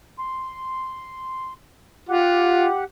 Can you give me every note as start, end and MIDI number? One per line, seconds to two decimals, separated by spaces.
0.19 1.53 84
2.09 2.65 65
2.09 2.84 67
2.09 2.84 78